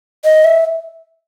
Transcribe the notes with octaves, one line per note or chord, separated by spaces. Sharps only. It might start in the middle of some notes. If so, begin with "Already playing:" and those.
D#5
E5